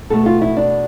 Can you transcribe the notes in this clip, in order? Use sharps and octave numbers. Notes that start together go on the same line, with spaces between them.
B2 A3 A4
F4
E4
D4